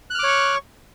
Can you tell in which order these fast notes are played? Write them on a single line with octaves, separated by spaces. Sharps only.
F#6 F6 D6 C#5 C#6